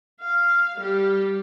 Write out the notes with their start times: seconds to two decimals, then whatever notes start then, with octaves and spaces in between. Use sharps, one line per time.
0.21 F5
0.77 G3 G4